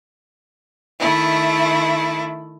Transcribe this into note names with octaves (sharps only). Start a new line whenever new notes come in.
D#3 A3 E4